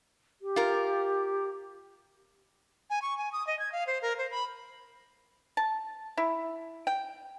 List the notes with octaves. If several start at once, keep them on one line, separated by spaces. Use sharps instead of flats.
G4
F4 A#4
G#5
C#6
G#5
D#6
D#5
G#6
F5
C5
A#4
C5
B5
A5
E4
G5